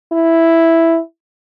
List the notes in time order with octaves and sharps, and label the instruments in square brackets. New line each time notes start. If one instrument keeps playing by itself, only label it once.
[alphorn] E4